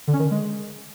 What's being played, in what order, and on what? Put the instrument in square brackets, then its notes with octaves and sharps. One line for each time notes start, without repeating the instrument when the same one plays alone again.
[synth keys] D3
C#4
D#3
D3
G#3